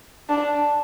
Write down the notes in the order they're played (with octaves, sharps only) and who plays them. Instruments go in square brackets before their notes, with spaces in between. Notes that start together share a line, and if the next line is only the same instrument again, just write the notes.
[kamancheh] D4